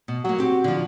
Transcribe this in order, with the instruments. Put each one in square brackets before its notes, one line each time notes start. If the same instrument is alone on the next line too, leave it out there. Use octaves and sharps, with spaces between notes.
[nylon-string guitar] B2
[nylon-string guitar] F#3 A#3 [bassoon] F#4
[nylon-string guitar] C4 G4
D3 F3